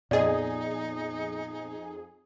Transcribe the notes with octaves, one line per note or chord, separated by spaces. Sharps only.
F2 A#2 B3 D#4 G#4 D5 D#5